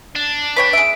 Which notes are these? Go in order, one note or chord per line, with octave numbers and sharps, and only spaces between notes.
D4
B4 C#5 G5 B6
G#4 E5 D7